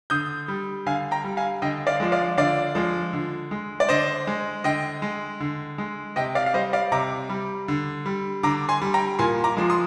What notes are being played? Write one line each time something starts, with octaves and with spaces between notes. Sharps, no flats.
D3 D#6 G6
G3
D3 F5 G#5
G5 A#5
G3
F5 G#5
D3 D#5 G5
D5 F5
F3 G#3
D5 F5
D3 D5 F5
F3 G#3
D3
G#3
D5
D3 C5 D#5
G#3
D3 D#5 G5
G#3
D3
G#3
C3 D#5 G5
D5 F5
F5
G3 C5 D#5
D5 F5
C3 A#5 D6
G3
D3
G3
D3 A#5 D6
G#5 C6
G3
G5 A#5
A#2 G#5 C6
A#5 D6
F3 G#3
C6 D#6